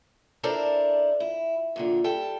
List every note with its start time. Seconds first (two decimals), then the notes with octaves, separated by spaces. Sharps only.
0.43 D4 E4 A4 A#4 C5 D5
1.20 E4
1.76 F2 A#2 D3
2.04 G3 A4 G5